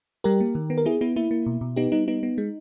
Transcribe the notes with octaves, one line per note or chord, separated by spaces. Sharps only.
G3 G4 A#4
A#3
D#3
B3
A#4
B3 E4 G#4
B3 E4
A#3 E4
A#3
B2
B2
B3 D#4 G4
G3 D#4
B3 D#4
B3
G#3